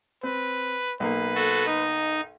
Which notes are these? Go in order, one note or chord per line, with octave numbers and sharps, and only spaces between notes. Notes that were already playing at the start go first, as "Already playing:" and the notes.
C4 B4
B1 A#3 B4
F#4 A4
D#4